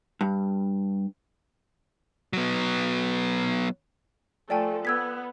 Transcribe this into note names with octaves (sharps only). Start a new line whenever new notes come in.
G2
F#3 B3
F3 A3 A4 D5 G5 G#5
B3 E6 G#6 B6